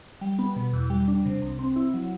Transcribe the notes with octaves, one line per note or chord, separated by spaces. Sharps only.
G3
B3
B2
E2
G3
D4
C3
C2
C4
E4
F#3